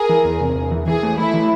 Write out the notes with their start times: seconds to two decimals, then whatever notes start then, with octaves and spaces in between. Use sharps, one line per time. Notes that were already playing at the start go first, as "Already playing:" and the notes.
Already playing: G#4 A#4
0.09 E3
0.25 E2
0.40 C3
0.55 E2
0.71 E3
0.87 E3 G#4
1.03 A3
1.18 A3 E4
1.34 E3